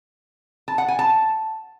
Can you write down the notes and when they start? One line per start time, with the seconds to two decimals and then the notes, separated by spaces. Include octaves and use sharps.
0.68 A5
0.78 F#5
0.88 G#5
0.99 A5